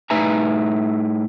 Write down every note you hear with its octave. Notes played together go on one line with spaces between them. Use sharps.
A2 D#4 B4 E5 G#5 A#5